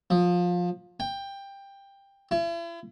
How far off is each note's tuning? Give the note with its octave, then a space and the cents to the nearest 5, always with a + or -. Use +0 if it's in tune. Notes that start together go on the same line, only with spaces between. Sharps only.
F3 +20
G5 +15
E4 +40